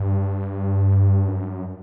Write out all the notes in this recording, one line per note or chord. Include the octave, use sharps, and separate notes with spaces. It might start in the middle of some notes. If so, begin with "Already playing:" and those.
Already playing: G2
F#2